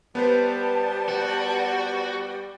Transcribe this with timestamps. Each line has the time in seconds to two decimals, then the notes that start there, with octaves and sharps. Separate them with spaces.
0.15 G3 B3 B4 C5 A5
1.08 F#4